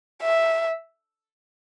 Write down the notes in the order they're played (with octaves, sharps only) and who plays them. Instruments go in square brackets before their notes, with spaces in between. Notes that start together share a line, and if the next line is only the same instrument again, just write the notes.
[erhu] E5